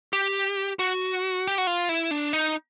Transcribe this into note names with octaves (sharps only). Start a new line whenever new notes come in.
G4
F#4
G4
F#4
F4
E4
D4
D#4